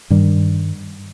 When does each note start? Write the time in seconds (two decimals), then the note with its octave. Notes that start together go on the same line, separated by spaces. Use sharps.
0.10 G2 D#3 G3